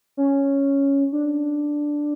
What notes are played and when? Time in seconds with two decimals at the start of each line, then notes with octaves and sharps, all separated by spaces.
0.17 C#4
1.13 D4